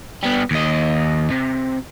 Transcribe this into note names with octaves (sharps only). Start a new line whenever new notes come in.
G3 B3
D#2 D#5
C3